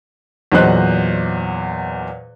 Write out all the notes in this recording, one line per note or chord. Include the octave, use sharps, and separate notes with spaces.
E2 A#2 F#3 C5 D#5 F#6